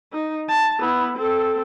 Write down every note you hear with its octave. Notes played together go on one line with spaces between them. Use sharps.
D#4
A5
B3 E4
C4 A4